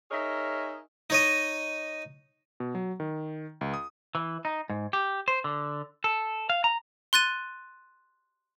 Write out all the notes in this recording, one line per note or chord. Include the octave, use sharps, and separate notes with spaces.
D#4 G#4 A#4 C#5 D#5 E5
D#4 C#5 D#5
B2
F#3
D#3
C#2
D#6
E3
D#4
G#2
G4
C5
D3
A4
F5
A#5
C6 F#6 A6 D#7